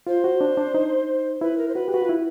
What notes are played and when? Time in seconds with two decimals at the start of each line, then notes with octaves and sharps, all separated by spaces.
0.07 F4 C5
0.24 F#4
0.41 D4
0.57 D4
0.74 D#4
1.41 E4 B4
1.58 A#4
1.69 C5
1.75 F#4 B4
1.88 G4
1.92 F#4 B4
2.02 F4
2.09 E4